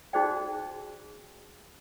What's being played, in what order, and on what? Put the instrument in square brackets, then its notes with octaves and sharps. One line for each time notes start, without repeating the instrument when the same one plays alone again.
[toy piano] D#4 F#4 G#4 C5 D5 G5